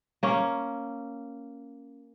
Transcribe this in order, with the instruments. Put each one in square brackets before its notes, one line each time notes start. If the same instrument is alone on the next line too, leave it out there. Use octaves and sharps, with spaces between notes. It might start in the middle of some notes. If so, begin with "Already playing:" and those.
[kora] A#3 C#4